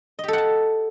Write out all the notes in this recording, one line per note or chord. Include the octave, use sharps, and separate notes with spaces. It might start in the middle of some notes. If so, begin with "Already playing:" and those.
G4 A4 D#5 F#5 A5